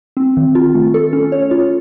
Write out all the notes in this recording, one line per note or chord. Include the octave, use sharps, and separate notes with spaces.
C4
D#3
F4
A3
A4
C#4
C#5
F4